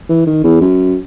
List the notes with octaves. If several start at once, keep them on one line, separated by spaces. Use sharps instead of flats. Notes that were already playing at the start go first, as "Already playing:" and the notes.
E3
D#3
E2
F#2